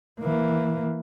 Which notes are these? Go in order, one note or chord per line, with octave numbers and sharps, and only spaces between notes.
E3 A#3